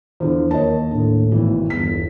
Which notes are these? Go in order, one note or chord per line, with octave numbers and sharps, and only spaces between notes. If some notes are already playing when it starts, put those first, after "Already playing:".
E2 D3 F3
D#2 A#4 C#5 D#5 A5
A2 D3
G#1 B2 E3
G1 E2 B6